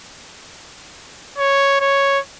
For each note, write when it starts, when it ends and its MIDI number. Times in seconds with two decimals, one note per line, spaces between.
1.38 1.79 73
1.81 2.19 73